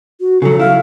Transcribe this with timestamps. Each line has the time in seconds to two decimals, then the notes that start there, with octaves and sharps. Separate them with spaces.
0.21 F#4
0.42 C#3 F#3 A4
0.60 E4 F5